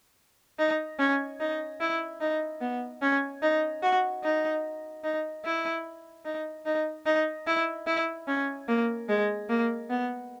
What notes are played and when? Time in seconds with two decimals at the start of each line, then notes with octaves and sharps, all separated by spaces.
0.59 D#4
0.99 C#4
1.40 D#4
1.81 E4
2.21 D#4
2.61 B3
3.02 C#4
3.42 D#4
3.82 F#4
4.23 D#4
5.04 D#4
5.45 E4
6.25 D#4
6.66 D#4
7.06 D#4
7.47 E4
7.87 E4
8.27 C#4
8.68 A#3
9.09 G#3
9.49 A#3
9.90 B3